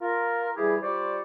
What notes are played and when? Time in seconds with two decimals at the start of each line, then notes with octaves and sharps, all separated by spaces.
0.01 F4 A#4
0.57 E3 G3 E4 G4 G#4
0.82 G3 F4 C5 D5 C#6 D6